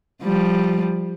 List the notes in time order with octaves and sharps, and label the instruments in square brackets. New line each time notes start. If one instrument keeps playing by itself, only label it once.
[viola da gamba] F3 G3